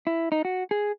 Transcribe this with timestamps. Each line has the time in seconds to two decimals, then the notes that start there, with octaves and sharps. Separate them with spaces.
0.07 E4
0.32 D#4
0.45 F#4
0.71 G#4